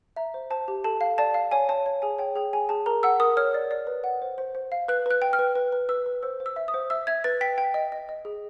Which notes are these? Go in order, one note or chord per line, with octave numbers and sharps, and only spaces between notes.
E5 A#5
C5
C5 A5
G4
A4 A5
F5
D5 A5
F5
C#5 G#5
C#5 A5
C#5
G#4 G#5
C#5 G5
G#4 G5
G#4 G#5
G#4 A5
A#4 A#5
F#5 E6
A#4 D#6
C#5 F6
D5
D5
B4
F#5
C5
C5
C5
F5
B4 F#6
B4 F#6
G5
F6
B4
B4
B4
B4 E6
B4
C5 E6
C5
E6
E5
D#6
C5
E5 E6
E5 G#6
B4 A6
G5 B6
G5
D#5
D#5
D#5
G#4